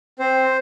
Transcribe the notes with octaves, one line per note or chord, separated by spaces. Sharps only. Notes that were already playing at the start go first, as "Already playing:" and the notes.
C4 C5